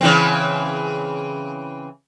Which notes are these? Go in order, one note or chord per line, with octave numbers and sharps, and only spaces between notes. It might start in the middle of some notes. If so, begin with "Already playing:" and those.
C#3 E3 C4